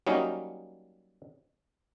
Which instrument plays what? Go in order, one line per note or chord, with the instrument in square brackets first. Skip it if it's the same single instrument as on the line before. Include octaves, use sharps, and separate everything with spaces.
[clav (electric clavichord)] F#3 G3 A#3 C#4 D#4